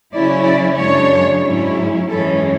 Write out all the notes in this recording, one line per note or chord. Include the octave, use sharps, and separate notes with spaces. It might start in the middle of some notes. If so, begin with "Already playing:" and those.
C#3 F#3 C#4 E4 D5
D5
F#2 C#3 G#3 D4 C#5
G#2 F#3 C#4 E4
F#2 E3 G#3 C#4 A4